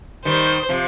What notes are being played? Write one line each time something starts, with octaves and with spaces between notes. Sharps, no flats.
D#3 G3 C5
C3 F3